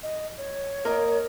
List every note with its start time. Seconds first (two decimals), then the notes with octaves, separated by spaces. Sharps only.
0.03 D#5
0.38 C#5
0.85 A#3 A#4 D#5